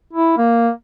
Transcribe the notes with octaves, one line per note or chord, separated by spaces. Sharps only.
E4
A#3